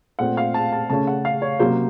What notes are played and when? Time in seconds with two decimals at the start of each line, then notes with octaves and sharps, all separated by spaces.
0.19 A#2 A3 C4 F#5
0.37 F5
0.54 A5
0.73 A5
0.90 C#3 A3 C#4 A5
1.07 F#5
1.25 F5
1.42 C#5
1.59 C3 F#3 A#3 C#4 C5